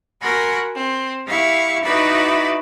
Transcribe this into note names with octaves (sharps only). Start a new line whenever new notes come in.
F#4 A#4 F#5 G#5 B5 C6
C4
E4 G4 E5 F5 C#6
D#4 E4 F#4 B4 D5 E5